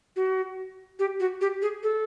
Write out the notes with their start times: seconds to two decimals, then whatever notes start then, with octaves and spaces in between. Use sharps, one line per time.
0.16 F#4
0.99 G4
1.20 F#4
1.41 G4
1.62 G#4
1.83 A4